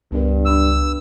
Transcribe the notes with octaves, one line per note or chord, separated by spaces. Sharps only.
C#2 G2 B3 D4 A#4
D4 B5 C#6 E6